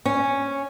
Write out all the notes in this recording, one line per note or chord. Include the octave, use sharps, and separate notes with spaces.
C#4